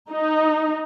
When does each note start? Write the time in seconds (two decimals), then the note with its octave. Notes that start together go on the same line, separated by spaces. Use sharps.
0.10 D#4